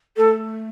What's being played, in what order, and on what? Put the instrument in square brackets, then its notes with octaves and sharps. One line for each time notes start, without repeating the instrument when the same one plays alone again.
[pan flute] A3 [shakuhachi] A4